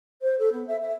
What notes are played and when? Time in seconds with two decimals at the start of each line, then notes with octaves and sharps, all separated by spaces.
0.21 C5
0.38 A4
0.52 B3
0.67 E5
0.80 E5